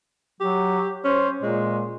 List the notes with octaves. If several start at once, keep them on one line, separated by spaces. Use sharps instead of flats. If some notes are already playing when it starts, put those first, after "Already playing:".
F#3 G4
C#4 C5
A#2 G#3